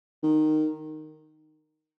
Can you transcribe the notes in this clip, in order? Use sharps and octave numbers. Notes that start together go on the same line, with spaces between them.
D#3